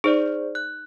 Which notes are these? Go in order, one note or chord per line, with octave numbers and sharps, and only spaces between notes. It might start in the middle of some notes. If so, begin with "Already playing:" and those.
D#4 G#4 C5 D5
F#6